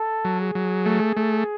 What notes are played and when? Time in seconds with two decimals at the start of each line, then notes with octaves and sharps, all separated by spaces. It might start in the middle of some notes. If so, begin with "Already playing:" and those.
Already playing: A4
0.25 F#3
0.40 G#4
0.55 F#3
0.86 A3
1.16 A3